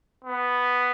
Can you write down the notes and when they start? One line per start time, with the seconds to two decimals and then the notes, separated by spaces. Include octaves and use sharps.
0.25 B3